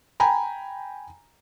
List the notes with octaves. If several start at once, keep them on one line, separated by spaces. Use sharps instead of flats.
G5 G#5 A#5 B5